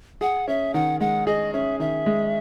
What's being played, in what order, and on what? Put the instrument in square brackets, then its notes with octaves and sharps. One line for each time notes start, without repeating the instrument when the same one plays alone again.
[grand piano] G#4 [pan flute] F#5
[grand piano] C#4 [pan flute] E5
[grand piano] D#3 [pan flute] F#5
[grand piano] G#3 [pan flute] F#5
[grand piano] G#4 [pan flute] D#5
[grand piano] C#4 [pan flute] E5
[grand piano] D#3 [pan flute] E5
[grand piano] G#3